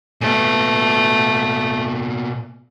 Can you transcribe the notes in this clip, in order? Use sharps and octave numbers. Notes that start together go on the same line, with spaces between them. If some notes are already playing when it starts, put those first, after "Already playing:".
A#2 A3 B3